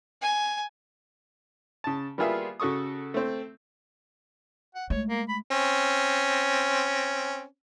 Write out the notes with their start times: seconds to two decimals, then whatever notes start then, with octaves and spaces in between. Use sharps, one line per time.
0.22 G#5
1.84 C#3 A5
2.18 G3 A#3 B3 F4 G#4 E5
2.60 C#3 F#4 A4 C#6 D#6
3.14 A3 C4
4.75 F#5
4.90 G#3 A3 C#5
5.08 A#3
5.29 B5
5.51 C4 C#4